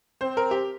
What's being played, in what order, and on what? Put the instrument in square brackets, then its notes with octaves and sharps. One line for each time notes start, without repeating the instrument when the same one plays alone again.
[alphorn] C4 [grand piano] C5
[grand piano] A#4
G4